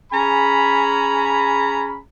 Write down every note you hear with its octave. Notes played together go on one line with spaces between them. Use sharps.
C#4 G#4 G#5 A#5 B5